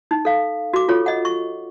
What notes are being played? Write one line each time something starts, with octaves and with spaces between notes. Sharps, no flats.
D#4
A4 F5
F#4 D6
F4 A4 C#5
D#5 F#5
C#6